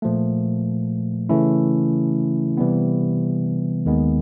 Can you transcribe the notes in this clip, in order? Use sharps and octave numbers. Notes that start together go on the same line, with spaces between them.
A#2 F3 A3
C#3 E3 A3 C#4 E4
C3 E3 G3 B3
D#2 D#3 G#3 B3